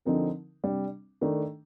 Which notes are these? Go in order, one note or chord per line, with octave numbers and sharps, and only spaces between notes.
D3 F3 C4 D#4 A#4
C3 G3 D4
D#3 A3 D4